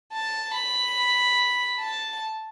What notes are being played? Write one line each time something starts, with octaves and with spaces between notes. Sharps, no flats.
A5
B5
A5